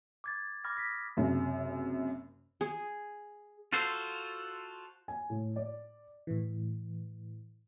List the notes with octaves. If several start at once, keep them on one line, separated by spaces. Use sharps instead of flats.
D6 G#6 A6
B5 D6 D#6 F6 G#6 A#6
D#6 A#6 B6
F#1 F#2 C3
G#4
F4 F#4 A4 C5
G#5
A2
D5
A2 E3